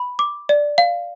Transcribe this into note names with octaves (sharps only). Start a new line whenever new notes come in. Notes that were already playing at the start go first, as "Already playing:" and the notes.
Already playing: B5
D6
D5
F5